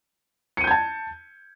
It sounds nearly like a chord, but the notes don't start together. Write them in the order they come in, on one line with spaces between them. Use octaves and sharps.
C#7 D#7 G6 G#6 A5